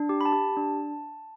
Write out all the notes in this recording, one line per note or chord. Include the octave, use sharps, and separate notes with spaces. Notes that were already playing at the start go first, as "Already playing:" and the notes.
Already playing: D4
G4
B5
A5
G4
D4